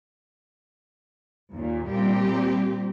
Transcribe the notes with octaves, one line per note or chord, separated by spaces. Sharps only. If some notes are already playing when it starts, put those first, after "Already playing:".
D#2 A#2
A#2 G3 C4 G4